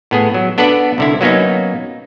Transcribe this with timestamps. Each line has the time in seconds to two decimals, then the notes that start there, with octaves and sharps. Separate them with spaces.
0.11 A2 B3 G#4
0.34 F#3
0.58 B3 D4 A4 B4 D5 F#5
0.98 C2 D3 E4
1.21 F#3 A#3 B3 C#4 D#4